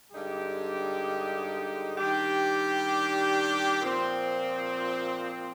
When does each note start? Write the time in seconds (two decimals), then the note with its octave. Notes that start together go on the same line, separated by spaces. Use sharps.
0.12 G2 D3 G#3 D#4 G4
1.97 D#3 G3 D4 G4
3.81 A#2 F3 C4